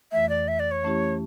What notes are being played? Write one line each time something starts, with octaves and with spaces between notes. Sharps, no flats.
F2 E3 A3 E5
D5
E5
D5
C#5
E3 A3 C#4 E4 G4